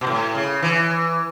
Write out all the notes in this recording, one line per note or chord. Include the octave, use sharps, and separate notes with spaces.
B2
A2
C#3
E3